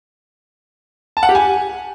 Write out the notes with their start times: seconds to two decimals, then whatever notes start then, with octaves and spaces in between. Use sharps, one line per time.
1.17 A5
1.23 F#5
1.29 G4
1.35 G#5